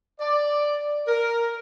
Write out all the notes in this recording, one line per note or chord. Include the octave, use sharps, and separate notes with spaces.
D5
A#4